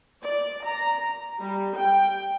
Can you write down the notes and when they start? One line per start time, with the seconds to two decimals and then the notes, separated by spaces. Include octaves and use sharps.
0.24 D5
0.64 A#5
1.41 G3
1.76 G5